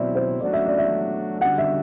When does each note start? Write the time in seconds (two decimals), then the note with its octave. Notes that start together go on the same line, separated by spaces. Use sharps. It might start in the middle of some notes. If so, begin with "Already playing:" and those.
Already playing: B2 F#3 C4 E4 D5 E5
0.15 C5
0.41 F#3 A3 D4 F#4 D5
0.53 E5
0.66 D5
0.78 E5
1.41 D3 G3 D4 F#4 F#5
1.58 E5